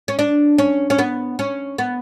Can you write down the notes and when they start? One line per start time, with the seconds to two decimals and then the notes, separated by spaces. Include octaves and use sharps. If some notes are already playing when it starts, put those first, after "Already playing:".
0.08 C#4
0.19 D4
0.58 C#4
0.90 C#4
0.99 B3
1.39 C#4
1.78 B3